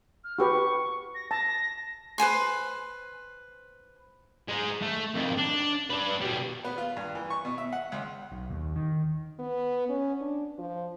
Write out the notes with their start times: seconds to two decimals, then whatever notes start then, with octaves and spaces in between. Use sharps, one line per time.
0.24 F6
0.39 F#4 G4 B4 C#6
1.15 A#6
1.31 A5 A#6
2.18 B4 C5 G#5 C6
4.49 G#3 D#4
4.82 A3
5.14 F2 D#3
5.37 D4
5.90 D4 B4
6.21 B2 G3
6.64 B3
6.78 F4
6.97 G2
7.15 E3
7.30 C#6
7.45 B2
7.58 E5
7.73 F#5
7.92 C#2
8.32 B1
8.50 D#2
8.76 D#3
9.39 B3
9.89 C#4
10.21 D4
10.58 F3